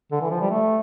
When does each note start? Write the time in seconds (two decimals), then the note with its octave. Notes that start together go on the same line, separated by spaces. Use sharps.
0.12 D3
0.21 E3
0.31 F3
0.41 G3
0.50 A3